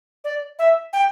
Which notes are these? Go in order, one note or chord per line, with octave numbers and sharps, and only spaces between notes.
D5
E5
G5